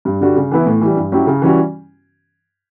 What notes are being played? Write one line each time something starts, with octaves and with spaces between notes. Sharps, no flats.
G2
D3 G3 D4 F#4
C#3
E3 B3 E4
A2
E3 G3
G2
F#3 C#4 E4 G4
C#3
E3 G3 C#4 F#4